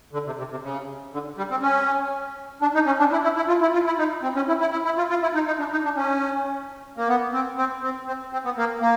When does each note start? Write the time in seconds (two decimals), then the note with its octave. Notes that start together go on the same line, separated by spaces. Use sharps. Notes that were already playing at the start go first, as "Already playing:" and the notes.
0.13 D3
0.26 C3
0.38 C3
0.51 C3
0.63 C#3
1.13 D3
1.38 G3
1.51 C4
1.62 C#4
2.62 D4
2.75 D#4
2.86 C#4
2.99 D4
3.12 E4
3.23 E4
3.36 E4
3.48 F4
3.62 E4
3.73 F4
3.86 E4
3.99 D#4
4.23 C4
4.36 C#4
4.48 E4
4.61 E4
4.72 E4
4.85 E4
4.97 F4
5.10 F4
5.22 E4
5.34 D#4
5.47 D#4
5.59 D4
5.72 D#4
5.85 D4
5.96 C#4
6.97 A#3
7.08 B3
7.33 C4
7.57 C4
7.82 C4
8.07 C4
8.33 C4
8.45 B3
8.57 A#3
8.81 A#3